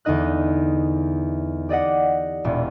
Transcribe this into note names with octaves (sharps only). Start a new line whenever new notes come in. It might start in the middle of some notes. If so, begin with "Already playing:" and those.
E2 D3 D#4 D#5 F#6
G4 D5 D#5 F#5
E1 E2 A#2